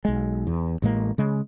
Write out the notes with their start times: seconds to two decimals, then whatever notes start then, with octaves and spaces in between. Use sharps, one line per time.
0.05 B1 G#3
0.47 E2
0.82 A1 A2 G#3 A#3
1.18 C#3 G#3